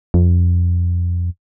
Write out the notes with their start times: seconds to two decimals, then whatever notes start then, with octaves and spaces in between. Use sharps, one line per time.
0.14 F2